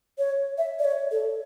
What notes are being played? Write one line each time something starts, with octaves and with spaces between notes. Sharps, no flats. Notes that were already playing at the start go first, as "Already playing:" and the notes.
C#5
E5
D5
C#5
A4